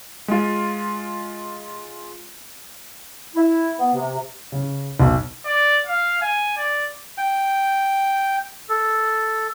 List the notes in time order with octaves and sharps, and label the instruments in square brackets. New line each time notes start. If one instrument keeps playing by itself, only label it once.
[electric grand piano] G#3 F4
[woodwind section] E4
B3
C3
[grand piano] C#3
B1
[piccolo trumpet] D5
F5
G#5
D5
[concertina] G5
A4